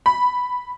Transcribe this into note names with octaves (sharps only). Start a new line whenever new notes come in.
B5